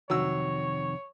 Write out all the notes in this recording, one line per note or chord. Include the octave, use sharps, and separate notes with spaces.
F2 C3 D#3 F#3 C#5 E6